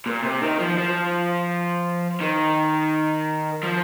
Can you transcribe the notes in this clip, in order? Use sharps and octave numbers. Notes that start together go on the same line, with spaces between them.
A#2
C3
D#3
F3
F3
D#3
F3